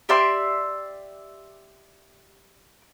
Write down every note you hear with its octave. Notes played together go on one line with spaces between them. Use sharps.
G4 D5 E5 C6